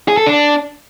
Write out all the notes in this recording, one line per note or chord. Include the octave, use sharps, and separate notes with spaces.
G#4
A4
D4